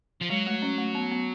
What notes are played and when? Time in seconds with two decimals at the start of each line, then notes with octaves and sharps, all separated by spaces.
0.22 F3
0.30 F#3 G#3
0.47 A3
0.62 C#4
0.78 A3
0.95 B3
1.12 B3